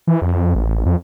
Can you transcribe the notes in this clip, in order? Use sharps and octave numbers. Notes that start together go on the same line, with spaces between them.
E3
F2
A1
F2